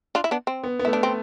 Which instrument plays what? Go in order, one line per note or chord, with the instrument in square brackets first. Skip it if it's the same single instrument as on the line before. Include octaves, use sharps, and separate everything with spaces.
[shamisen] D4 F4
E4
B3 D4
C4
[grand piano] B3
B3
[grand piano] A3 [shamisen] E4
[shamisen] D4
C4